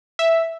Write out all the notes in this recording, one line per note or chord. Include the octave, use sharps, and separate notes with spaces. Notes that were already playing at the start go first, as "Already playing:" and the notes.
E5